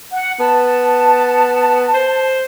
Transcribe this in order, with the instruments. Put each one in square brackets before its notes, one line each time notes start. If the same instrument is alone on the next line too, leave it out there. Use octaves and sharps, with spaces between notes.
[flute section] F#5
[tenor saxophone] B3 [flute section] A5
[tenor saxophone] C5